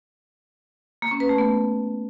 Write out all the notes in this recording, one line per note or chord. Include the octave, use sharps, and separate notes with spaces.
A#3
C#4
B4
A3
B3